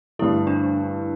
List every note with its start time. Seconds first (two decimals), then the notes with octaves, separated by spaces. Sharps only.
0.19 G2 D3 A3 E4
0.47 D4